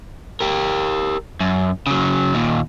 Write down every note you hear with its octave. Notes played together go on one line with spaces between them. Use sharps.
G4 A#4
F#2
C#3 F#3
D#2 A#2